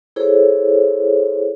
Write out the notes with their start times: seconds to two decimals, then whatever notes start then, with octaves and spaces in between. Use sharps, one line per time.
0.16 E4 G#4 A4 C5 C#5